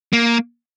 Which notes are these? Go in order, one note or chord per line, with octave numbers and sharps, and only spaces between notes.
A#3